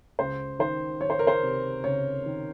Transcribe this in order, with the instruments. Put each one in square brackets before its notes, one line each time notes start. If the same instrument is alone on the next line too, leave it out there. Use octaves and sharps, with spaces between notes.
[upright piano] C#2 C5
D#3 C5
D#3 C#5
C5
A#4
C5
C3
C#2 C#5
D#3